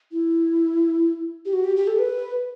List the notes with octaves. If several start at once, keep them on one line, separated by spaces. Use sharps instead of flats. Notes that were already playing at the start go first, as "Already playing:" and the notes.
E4
G4
F#4
G4
G4
A4
B4